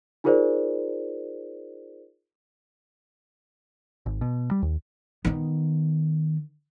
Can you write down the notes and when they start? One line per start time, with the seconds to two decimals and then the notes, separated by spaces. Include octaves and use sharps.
0.24 D#4 F4 G#4 A#4 C5 D5
4.06 G#1
4.21 B2
4.51 G3
4.62 D#2
5.25 D#3 B3